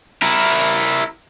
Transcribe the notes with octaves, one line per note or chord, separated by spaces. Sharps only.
E4 A#4